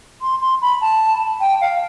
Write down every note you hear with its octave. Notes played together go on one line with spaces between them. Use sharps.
C6
C6
B5
A5
G5
F5